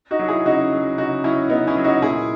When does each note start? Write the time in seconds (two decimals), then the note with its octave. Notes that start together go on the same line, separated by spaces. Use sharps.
0.11 D#4 F#4
0.19 F#3
0.28 E4 G#4
0.46 C#3 D#4 F#4
0.72 F#3
0.98 C#3 D#4 F#4
1.24 F#3 C#4 E4
1.50 C#3 B3 D#4
1.67 C#4 E4
1.76 F#3
1.84 D#4 F#4
2.02 A#2 E4 G#4